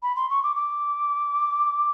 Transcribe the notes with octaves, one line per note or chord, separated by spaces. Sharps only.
B5
C6
C#6
D6
D6